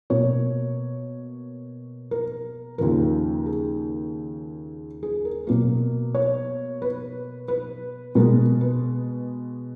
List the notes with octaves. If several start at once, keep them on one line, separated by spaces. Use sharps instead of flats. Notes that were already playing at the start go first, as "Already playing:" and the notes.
B2 A#3 C#5
A#4
D#2 C#3 F3 A#4
G#4
G#4
A#4
B2 F#3 A#3 A#4
C#5
B4
B4
B2 G#3 B3 A#4
B4